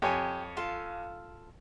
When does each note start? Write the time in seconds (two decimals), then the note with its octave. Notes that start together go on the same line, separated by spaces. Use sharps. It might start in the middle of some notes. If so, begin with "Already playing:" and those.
0.02 F2 G4 C#5 G#5
0.57 F4 A4 F5